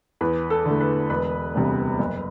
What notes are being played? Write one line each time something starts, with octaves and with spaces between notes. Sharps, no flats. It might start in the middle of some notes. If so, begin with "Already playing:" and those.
E2 B4
A4
D3 A3
B4
E1 B4
D2 C3 G3 B3
F#1